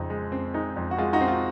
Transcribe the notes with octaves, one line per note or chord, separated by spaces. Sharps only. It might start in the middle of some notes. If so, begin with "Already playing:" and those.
Already playing: F2 C#3 D#4
G#3
C4
G#3 D#4
F2
F#4
G#3 F4
D#4 F#4
C4
F4